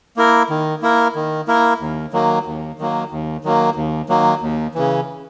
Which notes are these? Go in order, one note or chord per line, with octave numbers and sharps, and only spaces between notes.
A#3 E4 A#4
D#3
A#3 E4 A#4
D#3
A#3 E4 A#4
D#2
D#3 F#3 A#3
D#2
D#3 F#3 A#3
D#2
D#3 F#3 A#3
D#2
D#3 F#3 A#3
D#2
C#3 E3